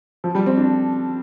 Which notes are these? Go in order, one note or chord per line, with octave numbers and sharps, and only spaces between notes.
F3
G3
C4
D4